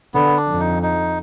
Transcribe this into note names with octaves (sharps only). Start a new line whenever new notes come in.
D3 B3
D4
F2
D#4
D#4